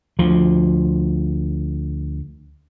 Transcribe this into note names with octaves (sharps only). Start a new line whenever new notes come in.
D2 F3